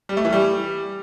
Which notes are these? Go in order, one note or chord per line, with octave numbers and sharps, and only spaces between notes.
G3
A3
E3
G3